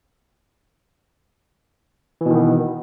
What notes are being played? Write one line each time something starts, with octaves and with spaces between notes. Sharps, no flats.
B2 D#3 E3 B3